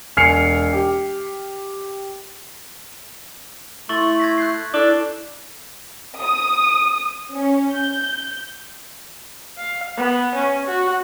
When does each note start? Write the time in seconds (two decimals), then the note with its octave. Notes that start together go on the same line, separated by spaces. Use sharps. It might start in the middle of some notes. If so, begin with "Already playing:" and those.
0.17 E1 G#5 F6 C7 C#7 F7
0.73 G4
3.89 A3 E4 C6 C#6 A6 F#7
4.19 G#6 A#6 B6
4.38 F#6 G6 C7
4.74 D4 E4 A4 D6
6.21 D#6
7.33 C#4
7.71 G6
9.58 F5
9.97 B3
10.35 C#4
10.67 F#4